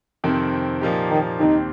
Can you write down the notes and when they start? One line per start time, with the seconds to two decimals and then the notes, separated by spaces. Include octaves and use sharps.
0.24 F2 C3 D#3 C4
0.81 A#2 F3 A#3 D#4 G4
1.10 D#3
1.39 D#2 D#3 C4 D#4 G4